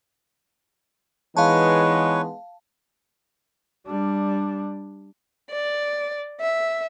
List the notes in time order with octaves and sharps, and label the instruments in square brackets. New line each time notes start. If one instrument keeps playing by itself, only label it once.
[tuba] E3 [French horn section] G#3 B3 D#4 [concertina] B4 C#5 [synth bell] F5 A5
[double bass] G3 D4
[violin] D5
E5